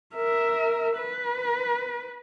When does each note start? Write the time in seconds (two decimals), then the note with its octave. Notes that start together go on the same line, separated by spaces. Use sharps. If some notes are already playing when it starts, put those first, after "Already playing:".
0.15 A#4 E5
0.96 B4